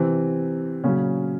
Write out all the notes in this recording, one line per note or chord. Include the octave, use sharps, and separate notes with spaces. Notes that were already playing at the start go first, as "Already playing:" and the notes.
Already playing: C3 E3 C4
A#2 C#3 F#3 C#4